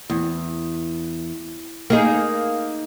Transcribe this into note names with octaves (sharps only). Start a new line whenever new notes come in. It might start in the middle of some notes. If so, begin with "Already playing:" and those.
E2
A#3 D#4 G#4